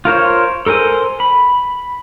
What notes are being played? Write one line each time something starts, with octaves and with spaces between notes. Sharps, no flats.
F4 A#4 C5 C#5
A4 A#4 C5 G#5
B5